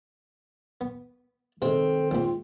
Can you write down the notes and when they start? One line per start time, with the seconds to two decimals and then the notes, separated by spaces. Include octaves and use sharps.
0.81 B3
1.62 C3 D#3 G#3 C4 A4
2.11 A#1 G#2 F4